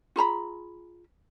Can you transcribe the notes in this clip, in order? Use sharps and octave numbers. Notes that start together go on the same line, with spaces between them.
F4 G#4 A#5 B5